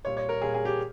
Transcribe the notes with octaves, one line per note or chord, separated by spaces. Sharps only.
A#2 G3 C#5
C#5
A#4
A#2 G3 G#4
G#4
G4